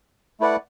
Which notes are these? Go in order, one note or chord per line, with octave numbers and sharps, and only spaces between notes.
A3 E4 B4 D5 F#5